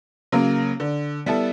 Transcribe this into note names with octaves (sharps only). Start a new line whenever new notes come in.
C#3 F#3 A#3
D3
G3 B3 E4 A4